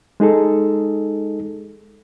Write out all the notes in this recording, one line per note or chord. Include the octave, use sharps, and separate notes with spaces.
G#3 D#4 G#4 A4